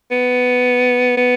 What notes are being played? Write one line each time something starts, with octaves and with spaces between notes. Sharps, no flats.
B3
B3